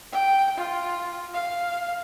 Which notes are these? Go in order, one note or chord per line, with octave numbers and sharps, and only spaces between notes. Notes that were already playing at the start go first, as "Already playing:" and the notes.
G5
F4
F5